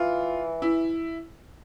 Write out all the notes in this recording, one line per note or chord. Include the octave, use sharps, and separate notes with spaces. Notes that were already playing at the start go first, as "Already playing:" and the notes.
Already playing: E3 F4
E4